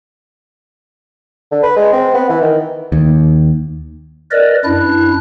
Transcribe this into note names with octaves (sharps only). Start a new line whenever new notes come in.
D3
B4
G#3
C4
B3
E3
D#3
D#2
A#4 B4 D5 D#5
F#2 D4 E4 F#6